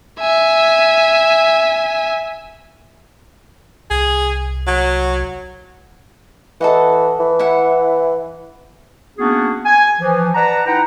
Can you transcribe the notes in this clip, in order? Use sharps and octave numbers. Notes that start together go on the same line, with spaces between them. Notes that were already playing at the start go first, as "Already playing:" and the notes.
E5 G#5
C2 G#4
F#3
E3 A4 D#5 F#5
E3
E4 F#5
A#3 B3 C#4 D4 F#4 G#4
G#5
E3 F3
B4 D5 F#5 A5 A#5
D#4 E4 B4 F#5 G5 A#5